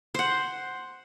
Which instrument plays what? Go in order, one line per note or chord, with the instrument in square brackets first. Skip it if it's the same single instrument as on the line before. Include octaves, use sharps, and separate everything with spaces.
[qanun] C5 F#5